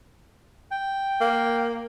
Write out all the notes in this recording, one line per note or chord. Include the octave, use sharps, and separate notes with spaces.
G5
A#3